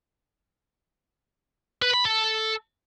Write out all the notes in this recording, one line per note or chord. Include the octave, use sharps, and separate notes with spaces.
B4
B5
A4